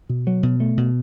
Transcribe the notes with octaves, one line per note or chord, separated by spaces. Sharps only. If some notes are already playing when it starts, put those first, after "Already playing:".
B2
F#3
B2
A3
B2